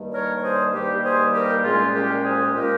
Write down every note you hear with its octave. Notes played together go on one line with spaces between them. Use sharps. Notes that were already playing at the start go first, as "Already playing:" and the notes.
Already playing: G2 D#3 G3 A#3
A#4 C#5
C#5
G#4 C5
G2 D#3 G3 A#3 G4
G#4 C5
G4 A#4
C2 A#2 G#3 C#4 F4 G#4
G4 A#4
G#4 C5
A#2 G#3 C#4 G4 A#4